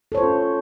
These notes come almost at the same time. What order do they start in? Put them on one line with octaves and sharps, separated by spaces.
A4 C#5 C5 F4 C#4